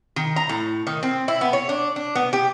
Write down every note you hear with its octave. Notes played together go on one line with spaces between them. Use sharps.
D#3
A#5
A2
D#3
C4
E4
B3
C#5
D4
D4
B3
G4